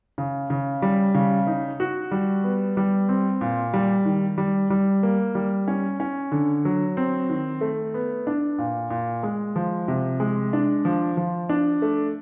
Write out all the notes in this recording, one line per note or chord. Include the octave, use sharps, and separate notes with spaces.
C#3
C#3
G3
C#3
D#4
F#4
G3
B3
G3
C4
A#2
G3
D#3
G3
G3
A#3
G3
C#4
C#4
D3
F#3
C4
D#3
A3
B3
D4
A#2
A#2
G#3
F3
C3
G#3
D4
F3
F3
D4
A3